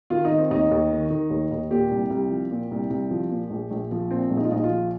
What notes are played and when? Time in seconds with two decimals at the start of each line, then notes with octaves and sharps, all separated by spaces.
0.10 D#3 F4
0.25 D#4
0.31 D#3
0.38 C4
0.51 D#2 D#4
0.71 D#2
0.91 D#3
1.10 D#3
1.30 D#2
1.51 D#2
1.70 A#2 G4
1.91 C2
2.10 C2
2.30 F3
2.51 A#2
2.71 C2
2.90 C2
3.11 F3
3.30 A#2
3.50 A#1
3.71 A#1
3.91 F3
4.10 A#2 C4
4.30 A#1
4.37 D#4
4.45 F4
4.51 A#1 D#4
4.64 F4
4.70 F3